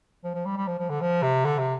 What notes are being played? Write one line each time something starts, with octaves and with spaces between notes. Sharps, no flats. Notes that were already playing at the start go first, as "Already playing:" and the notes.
F3
F3
G3
G3
F3
F3
D3
F3
C3
D3
C3